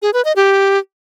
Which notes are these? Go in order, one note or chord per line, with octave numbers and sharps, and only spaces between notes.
G#4
B4
D#5
G4